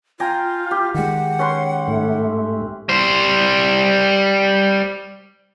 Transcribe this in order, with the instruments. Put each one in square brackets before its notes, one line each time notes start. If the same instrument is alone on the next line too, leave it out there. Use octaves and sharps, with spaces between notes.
[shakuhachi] F4 [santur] G5 G#5 A#5
[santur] G4
[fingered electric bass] D#3 G#3 [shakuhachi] F#5
[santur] C#4 B4 C6
[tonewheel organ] G#2 A3
[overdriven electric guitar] G3 C5